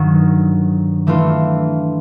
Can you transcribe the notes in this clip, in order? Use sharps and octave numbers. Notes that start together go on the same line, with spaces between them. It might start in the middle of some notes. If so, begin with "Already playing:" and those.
Already playing: G2 D#3 F#3
E3 A3 D4 F4